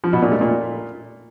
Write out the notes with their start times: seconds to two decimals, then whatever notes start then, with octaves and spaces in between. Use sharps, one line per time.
0.04 F3
0.13 B2
0.22 A#2
0.32 A3
0.41 A#2